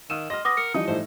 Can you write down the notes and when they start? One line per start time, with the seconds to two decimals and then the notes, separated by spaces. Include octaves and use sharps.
0.10 D#3 F5 E6 D#7 E7
0.30 D#5 C6 F6 A#6
0.45 B4 F#5 D6 D#6 A#6
0.57 A#4 C#7
0.74 E3 F3 G3 D#4 D#5 D#6
0.88 A2 A3 D#4 C5